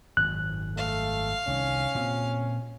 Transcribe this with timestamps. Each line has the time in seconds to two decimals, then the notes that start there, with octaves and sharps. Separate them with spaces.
0.17 G#1 F#2 F#6
0.77 A3 F5
1.47 C2 D#3 C#4
1.95 A#2 C4